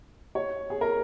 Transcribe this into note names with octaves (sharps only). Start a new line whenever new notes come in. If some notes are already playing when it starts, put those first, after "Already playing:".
C#5
G#4
A#4